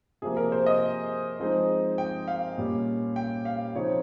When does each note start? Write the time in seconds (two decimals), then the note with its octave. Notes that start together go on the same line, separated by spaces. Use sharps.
0.22 C3 F3 A#3 G#4
0.37 A#4
0.52 C5
0.66 D#5
1.40 F3 G#3 C4 D#4
1.98 G5
2.28 F5
2.58 A#2 G3 C#4
3.16 G5
3.45 F5
3.75 C#3 F3 C4 D#4 C#5